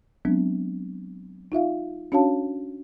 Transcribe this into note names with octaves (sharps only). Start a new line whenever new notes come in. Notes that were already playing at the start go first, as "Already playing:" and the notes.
F#3 G#3 B3 C4 D4
D#4 F4 E5 F5
C#4 D4 F#4 C#5 F5 A5